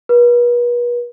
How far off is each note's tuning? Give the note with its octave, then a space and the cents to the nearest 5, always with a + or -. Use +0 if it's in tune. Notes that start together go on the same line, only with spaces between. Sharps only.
B4 -40